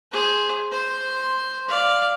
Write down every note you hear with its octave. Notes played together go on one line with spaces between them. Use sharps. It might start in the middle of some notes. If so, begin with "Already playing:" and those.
G#4 C5
C5 C6
D5 F5